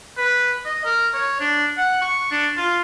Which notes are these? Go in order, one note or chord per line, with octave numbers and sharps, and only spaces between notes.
B4
D#5
A#4
C#5
D4
F#5
C#6
D4
F4